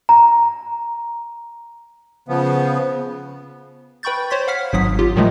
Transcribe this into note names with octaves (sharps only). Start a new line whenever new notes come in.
A#5
C#3 F3 B3
B4 G5 B5 C#6 G6 A6
C5 C#5 C6 B6
F5 F#5 F6 B6
G#1 G#2 F#3 D#6 B6
F4 G4
A#2 D#3 F3 F#3 G#3 A3